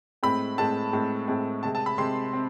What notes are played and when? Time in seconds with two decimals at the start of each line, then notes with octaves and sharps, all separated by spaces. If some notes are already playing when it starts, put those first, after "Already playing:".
0.23 A2 G#3 C4 B5
0.58 A2 G#3 C4 A5
0.93 A2 G#3 C4
1.28 A2 G#3 C4
1.63 C3 G#3 C4 A5
1.75 A5
1.86 B5
1.98 C3 G#3 C4 C6
2.33 C4